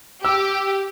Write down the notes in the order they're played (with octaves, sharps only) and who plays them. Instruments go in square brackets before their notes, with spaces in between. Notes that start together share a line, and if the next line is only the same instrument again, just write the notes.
[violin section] G4 [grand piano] E6